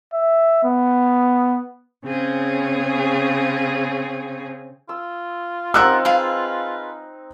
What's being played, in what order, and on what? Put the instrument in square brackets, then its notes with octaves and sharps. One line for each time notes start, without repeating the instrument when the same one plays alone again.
[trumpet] E5
B3
[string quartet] C#3 C4 C#4 G#4
[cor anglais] F4 [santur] E6
[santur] C4 D#4 [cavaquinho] A#4 F#5 D#6 [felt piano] E6 F#6
[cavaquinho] G#4 B4 F5